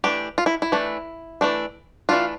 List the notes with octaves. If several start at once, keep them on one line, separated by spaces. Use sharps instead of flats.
E3 A3 D4 G4
F4
E4
E4
E3 A3 D4
E3 A3 D4
E3 A3 D4 F4